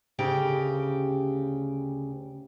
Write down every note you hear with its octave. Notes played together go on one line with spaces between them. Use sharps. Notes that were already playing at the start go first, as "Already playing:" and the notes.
D2 C#3 G4 G5